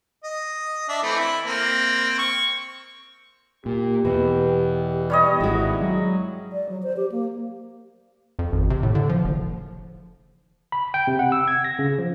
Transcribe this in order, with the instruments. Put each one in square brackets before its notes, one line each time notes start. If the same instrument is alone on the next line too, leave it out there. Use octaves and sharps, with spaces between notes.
[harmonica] D#5
D4 E5
E3 A3 C4
E4
A#3 C4
C#6
[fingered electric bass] A#2 [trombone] G4
[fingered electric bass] E2 [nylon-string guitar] B2
[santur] G3 C#5 D#5
[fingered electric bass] G#1 [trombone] G#3 [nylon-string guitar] E4 F#4
[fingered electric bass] F#3
[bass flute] D5
F#3
C5
G4
A#3
[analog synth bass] F2
G#1
C3
A2
D3
F3
F#1
[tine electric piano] B5
G5
C3
F#5
E6
G#6
A#6
C#3
F3